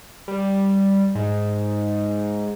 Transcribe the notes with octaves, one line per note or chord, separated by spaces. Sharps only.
G3
G#2